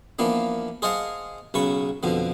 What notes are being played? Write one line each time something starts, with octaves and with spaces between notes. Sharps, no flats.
E3 F3 A#3 B3 D4
G#4 C5 D#5 F5 F#5 A5
B1 C#3 B4 C#6
F2 B2 D3 F3